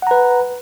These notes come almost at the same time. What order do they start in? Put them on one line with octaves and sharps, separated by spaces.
F#5 A#5 B4